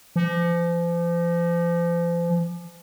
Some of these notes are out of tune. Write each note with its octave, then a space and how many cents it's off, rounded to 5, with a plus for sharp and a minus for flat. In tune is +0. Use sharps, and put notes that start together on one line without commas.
F3 -35